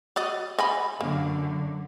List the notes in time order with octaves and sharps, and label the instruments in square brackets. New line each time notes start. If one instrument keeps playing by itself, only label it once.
[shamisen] F#4 D5 D#5
D#5 G#5 B5
[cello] F#2 D3 [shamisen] A#3